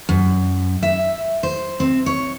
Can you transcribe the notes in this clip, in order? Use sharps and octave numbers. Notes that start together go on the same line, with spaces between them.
F#2
E5
C5
C4
C#5